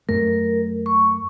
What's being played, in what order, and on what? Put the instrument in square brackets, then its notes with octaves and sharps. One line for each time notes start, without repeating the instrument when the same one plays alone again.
[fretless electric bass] F#2 A3 [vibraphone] A#4
[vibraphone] C#6